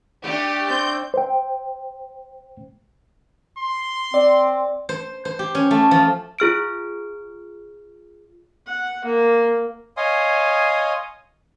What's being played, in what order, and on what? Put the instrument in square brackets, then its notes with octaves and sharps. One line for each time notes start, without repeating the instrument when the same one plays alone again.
[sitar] A3 D4 [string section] G4
[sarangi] C4 [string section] G6
[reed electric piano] C5 G5
[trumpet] C6
[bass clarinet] C4 [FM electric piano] D5
[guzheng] C5
C5
G4
C#4
A3
F3
[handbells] F4 G#4 F6 D7
[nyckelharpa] F#5
A#3
[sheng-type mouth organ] C#5 D#5 F5 G#5 C6 D#6